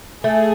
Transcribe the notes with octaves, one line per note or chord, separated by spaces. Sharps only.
A3 G#4